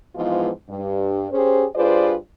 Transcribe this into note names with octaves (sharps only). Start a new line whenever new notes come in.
G#2 E3 F3 G#3 B3 F4
G2
C#4 G4 G#4 C5
G2 F4 G#4 B4 C5 D5